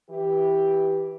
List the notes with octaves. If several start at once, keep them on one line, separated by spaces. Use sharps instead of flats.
E3 G4